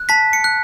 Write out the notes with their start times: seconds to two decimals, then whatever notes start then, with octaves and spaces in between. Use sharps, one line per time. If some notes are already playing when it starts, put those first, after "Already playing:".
Already playing: F#6
0.09 A5 B6
0.33 C#7
0.44 F#6